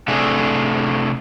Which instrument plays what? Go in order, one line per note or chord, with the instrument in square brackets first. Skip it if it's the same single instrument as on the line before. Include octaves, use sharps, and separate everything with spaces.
[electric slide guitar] C3 A3 D4 E4 G#4